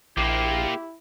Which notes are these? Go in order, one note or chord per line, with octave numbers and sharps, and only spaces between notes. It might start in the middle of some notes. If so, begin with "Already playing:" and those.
A#1 A#3 E4 F4 G4